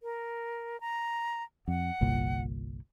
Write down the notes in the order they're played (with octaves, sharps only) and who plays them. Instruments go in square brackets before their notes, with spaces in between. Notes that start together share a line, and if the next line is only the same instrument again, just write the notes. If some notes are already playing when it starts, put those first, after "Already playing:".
[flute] A#4
A#5
[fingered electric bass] F2 [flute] F#5
[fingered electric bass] G1 C2 A#2